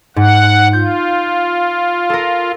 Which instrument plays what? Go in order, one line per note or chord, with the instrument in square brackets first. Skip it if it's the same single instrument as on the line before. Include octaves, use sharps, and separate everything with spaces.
[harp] G#2 [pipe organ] F#5
[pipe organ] F4 [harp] G6
[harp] A4 A#4